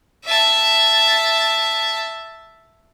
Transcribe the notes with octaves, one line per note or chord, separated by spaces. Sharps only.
E5 A5